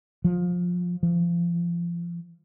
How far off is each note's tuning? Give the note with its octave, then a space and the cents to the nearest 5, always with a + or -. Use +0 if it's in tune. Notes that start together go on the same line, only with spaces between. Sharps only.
F3 +20
F3 -30